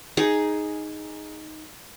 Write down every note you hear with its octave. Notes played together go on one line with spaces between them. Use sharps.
D#4 G#4